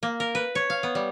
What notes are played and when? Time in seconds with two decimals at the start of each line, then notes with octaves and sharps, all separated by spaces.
0.03 A#3
0.20 A#4
0.35 B4
0.55 C#5
0.70 F5
0.83 B3
0.95 G3